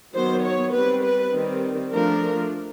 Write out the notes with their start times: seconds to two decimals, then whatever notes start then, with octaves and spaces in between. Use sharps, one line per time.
0.14 D#3 F#3 B3 C5
0.43 C#5
0.73 G3 C4 B4
1.04 B4
1.32 D#3 G3 C4
1.92 F3 A3 D4 A#4